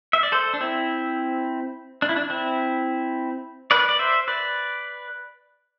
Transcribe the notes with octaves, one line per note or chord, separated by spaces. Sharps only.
E5
D5
A4 C5
D4
C4 E4
D4
E4
D4
C4 E4
B4 D5
D5
C5 E5
B4 D5